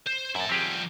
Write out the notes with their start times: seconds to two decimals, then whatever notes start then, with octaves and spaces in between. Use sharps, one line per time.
0.06 C5
0.35 F#2 E4 A5
0.49 F3 G3 C4 G4 G#4